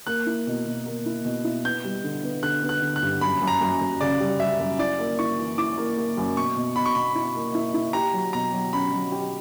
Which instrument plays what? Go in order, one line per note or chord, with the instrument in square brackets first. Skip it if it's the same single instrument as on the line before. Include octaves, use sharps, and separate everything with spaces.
[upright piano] A#3 [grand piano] F#6
[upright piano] E4
B2
B2
A#3
E4
B2
E4
[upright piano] B3 [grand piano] G6
[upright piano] G3
D3
B3
[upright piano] D3 [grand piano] F#6
[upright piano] B3
[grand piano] F#6
[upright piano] D3
[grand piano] F#6
[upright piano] G2
[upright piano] F#2 [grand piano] B5
[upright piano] F#2
[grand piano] A#5
[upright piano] F#2
F#2
[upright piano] C#3 [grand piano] D5
[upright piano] G3
[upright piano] G3 [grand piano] E5
[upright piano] F#2
[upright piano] E4 [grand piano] D5
[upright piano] A#3
[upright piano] E4 [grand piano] C#6
[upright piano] E3
[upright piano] E4 [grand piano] D6
[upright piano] A#3
A#3
F#2
[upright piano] B2 [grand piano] C#6
[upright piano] B2
[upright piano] B2 [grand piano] B5
[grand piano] C#6
[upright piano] B2 [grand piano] B5
[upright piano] E4
A#3
E4
E4
[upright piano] G4 [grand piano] A#5
[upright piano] F#3
[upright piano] B2 [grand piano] A#5
[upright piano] F#3
[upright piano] C#4 [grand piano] B5
[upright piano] F#3
G4